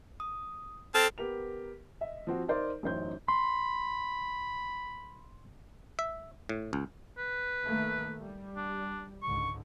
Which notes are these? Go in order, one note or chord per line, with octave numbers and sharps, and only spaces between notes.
D#6
C4 A4 A5 F6
B3 G4 A#4 F7
D#5 E5
F3 C4 F#4
D#4 A#4 C5 D5 E5
A1 F#2 D#4 C5 C#5 G6
B5 C6
E5
A2
C#2
B4
D#3 A3 A#3
G3
D4
C#2 G#2 D3 C#6